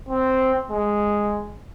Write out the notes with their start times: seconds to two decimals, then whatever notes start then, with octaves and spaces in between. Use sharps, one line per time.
0.09 C4
0.71 G#3